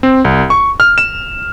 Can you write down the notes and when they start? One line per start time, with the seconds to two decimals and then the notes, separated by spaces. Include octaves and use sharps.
0.03 C4
0.25 C2
0.50 C#6
0.80 F6
0.98 E7